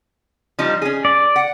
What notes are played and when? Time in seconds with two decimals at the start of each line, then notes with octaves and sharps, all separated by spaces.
0.59 F3 G3 D#4
0.82 C#4 G#4
1.05 D5
1.36 F#5